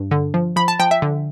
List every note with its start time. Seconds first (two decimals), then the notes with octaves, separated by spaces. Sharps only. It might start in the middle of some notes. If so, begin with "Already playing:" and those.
Already playing: G2
0.11 D3
0.34 F3
0.56 F3 B5
0.68 A5
0.80 F3 G5
0.91 E5
1.02 D3